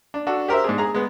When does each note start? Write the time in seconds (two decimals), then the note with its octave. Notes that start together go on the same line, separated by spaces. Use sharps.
0.14 D4
0.27 D4 F#4 A4
0.48 G4 A#4 C5 E5
0.64 G#2 D4 G#4
0.78 G#4 A#5
0.94 G#3 B3